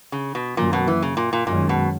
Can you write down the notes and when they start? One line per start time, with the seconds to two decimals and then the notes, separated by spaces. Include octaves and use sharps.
0.12 C#3
0.35 B2
0.57 F#2 A#2 D#3 F#3 A#3
0.73 B2
0.88 E3
1.02 C#3
1.17 A#2
1.33 A#2
1.47 F#2 A#2 D#3 G#3 C#4
1.69 B2